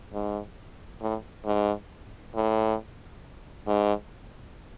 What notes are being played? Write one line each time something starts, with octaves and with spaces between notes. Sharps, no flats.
G#2
A2
G#2
A2
G#2